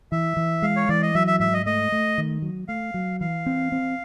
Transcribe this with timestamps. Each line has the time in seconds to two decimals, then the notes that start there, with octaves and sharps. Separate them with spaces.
0.12 E3 E5
0.37 E3
0.62 G#3 F5
0.76 C#5
0.89 E3 D5
1.02 D#5
1.15 F#3 E5
1.27 E5
1.40 G#2 E5
1.54 D#5
1.66 A3 D#5
1.92 A3
2.18 D#3
2.42 F#3
2.68 A3 F5
2.94 F#3
3.20 E3 F5
3.46 C4
3.72 C4